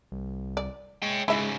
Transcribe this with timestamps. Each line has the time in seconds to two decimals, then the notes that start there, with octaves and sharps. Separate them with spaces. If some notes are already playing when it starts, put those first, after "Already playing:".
0.12 C2
0.57 D5
1.02 G#3 C#5 G5
1.28 G#2 C#3 G#3 E4 E5